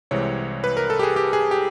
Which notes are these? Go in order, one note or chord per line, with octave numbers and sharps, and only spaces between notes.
C2 C3 E3 G#3 C4 C#5
B4
A#4
A4
G4
G#4
G4
G#4
G4